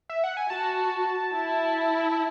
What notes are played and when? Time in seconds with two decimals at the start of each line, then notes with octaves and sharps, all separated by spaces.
0.10 E5
0.24 F#5
0.37 G#5
0.50 F#4 A5
1.33 E4